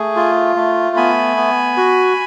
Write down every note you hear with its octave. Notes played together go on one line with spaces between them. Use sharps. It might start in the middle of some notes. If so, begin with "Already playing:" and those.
Already playing: A3 G#4
F4
A3
B3 G#5 B5
B3
F#4